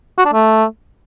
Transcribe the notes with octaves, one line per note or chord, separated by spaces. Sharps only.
F#4
D4
A3